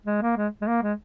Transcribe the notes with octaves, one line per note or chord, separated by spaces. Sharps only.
G#3
A#3
G#3
G#3
A#3
G#3